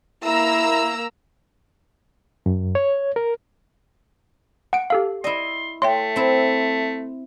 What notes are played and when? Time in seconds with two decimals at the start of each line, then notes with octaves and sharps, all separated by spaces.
0.24 A#3 E4 A#5 E6
2.46 F#2
2.75 C#5
3.16 A#4
4.73 F#5 D7
4.90 G4 A4 F5
5.24 E4 D5 D#5 C6
5.82 A3 C#5 E5 G5 C6
6.16 C4 E4